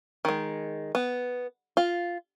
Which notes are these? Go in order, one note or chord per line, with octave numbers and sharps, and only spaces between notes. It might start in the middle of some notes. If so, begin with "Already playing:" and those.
D#3 G#3
B3
F4